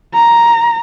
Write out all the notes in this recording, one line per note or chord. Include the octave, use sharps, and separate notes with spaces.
A#5